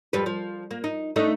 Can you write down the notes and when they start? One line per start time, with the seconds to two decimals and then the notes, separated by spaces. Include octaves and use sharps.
0.13 F2 G3 B4
0.26 F3
0.71 A#3
0.84 D#4
1.16 A3 D4 D#4